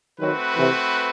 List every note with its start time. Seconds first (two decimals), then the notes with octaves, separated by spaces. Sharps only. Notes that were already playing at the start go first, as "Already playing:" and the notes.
0.20 D#3 F#3 A3 C4 F#4 B4
0.57 C3 E3